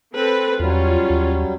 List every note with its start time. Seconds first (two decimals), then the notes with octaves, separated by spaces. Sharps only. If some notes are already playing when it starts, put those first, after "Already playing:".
0.15 C4 A4 B4
0.59 E2 F#3 G3 C#4 F4
1.10 D#2